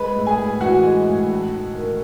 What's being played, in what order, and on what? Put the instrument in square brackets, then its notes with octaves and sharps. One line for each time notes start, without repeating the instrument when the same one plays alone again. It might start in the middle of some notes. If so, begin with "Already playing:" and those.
Already playing: [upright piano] G#3 B4 B5
A2
G#4 G#5
A2
E3 F#4 F#5
G#3
A2
A3
D#4
D#3